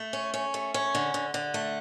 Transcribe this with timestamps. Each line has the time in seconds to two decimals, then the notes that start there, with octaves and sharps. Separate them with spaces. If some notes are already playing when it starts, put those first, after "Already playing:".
Already playing: A3
0.13 C#4
0.34 C#4
0.54 A3
0.74 C#4
0.95 D3
1.14 D3
1.34 D3
1.54 A3